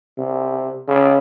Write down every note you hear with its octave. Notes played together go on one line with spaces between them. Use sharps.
C3
C#3